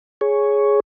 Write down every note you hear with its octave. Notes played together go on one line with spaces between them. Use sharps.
G#4 C#5